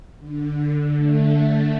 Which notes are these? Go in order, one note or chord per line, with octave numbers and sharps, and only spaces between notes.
D3
A3